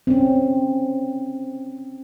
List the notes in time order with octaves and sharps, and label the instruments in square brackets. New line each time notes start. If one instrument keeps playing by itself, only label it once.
[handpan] C4 C#4